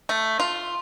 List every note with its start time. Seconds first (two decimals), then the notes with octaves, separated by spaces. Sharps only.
0.09 A3
0.40 F4